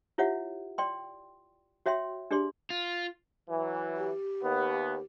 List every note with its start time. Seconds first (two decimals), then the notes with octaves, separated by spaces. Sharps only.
0.18 E4 F4 G4 C#5 E5 F#5
0.78 D5 G5 C6
1.86 F#4 C#5 E5 G5 C6
2.31 D4 G4 G#4 D5 C6
2.70 F4
3.49 E3 F#3
3.97 G4
4.42 D#2 B3